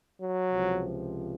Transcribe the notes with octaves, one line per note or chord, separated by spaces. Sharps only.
F#3
C#2 C3 F3